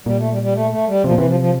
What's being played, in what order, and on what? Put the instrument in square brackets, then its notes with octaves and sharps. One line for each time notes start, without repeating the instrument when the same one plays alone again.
[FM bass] A#2 [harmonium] G3
[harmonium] A3
G3
G3
A3
A3
G3
[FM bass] C3 [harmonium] F3
[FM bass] A#2
[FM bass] C3 [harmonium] E3
[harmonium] F3
F3